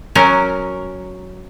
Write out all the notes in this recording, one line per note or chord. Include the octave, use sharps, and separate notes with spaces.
F#3 C#4 A#4